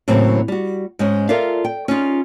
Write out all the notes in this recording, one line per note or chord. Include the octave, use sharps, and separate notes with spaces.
A2 C#3 E3 F#3 A#3 C4
G3 F#4
G#2 G#3 C#4
F4 A4 A#4 D5 E5 F5
G5
C#4 D#4 F4 G#4